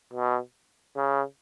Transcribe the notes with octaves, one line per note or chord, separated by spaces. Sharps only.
B2
C#3